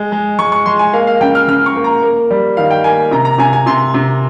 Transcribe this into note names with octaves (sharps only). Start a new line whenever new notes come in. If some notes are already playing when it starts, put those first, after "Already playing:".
Already playing: G#3
G#3
G#3 C#6
C#6
G#3 C6
G#5
A#3 F5
F5
C#3 G5
F6
C#3 F6
C#6
A#3
A#5
A#3
G3
D#3 F5
G5
A#3 G#5
C3 A#5
A#5
C3 G#5
G#5
C3 C6
C3